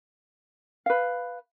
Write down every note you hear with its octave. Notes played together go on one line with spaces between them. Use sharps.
B4 F5